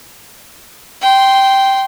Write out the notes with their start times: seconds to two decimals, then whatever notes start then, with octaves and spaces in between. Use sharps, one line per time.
1.02 G5 C6